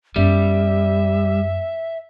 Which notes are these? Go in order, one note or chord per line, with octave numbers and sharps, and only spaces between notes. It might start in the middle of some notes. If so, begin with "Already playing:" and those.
F#2 G3 B3 E5